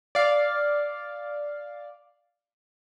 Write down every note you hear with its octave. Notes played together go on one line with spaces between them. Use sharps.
D5 F5